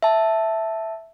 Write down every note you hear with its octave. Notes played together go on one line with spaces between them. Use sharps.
E5 A5